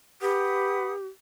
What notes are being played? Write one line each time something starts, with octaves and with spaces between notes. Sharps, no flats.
G4 B4 F#5 D#6